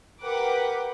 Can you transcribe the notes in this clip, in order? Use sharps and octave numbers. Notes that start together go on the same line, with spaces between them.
G4 A#4 B4 F#5 D6